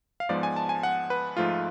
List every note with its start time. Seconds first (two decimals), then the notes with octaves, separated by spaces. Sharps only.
0.20 F5
0.29 G#2 F3 G#3 B3 D5
0.43 G#5
0.56 A5
0.69 G#5
0.83 F#5
1.10 B4
1.37 G#2 F3 A3 F4